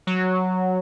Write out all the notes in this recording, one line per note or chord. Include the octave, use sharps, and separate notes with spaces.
F#3